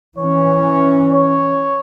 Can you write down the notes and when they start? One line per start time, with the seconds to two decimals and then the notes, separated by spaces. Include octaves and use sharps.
0.18 E3 C#4 C#5
1.12 C#5